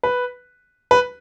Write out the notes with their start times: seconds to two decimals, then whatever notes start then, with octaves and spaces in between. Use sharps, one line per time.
0.03 B4
0.91 B4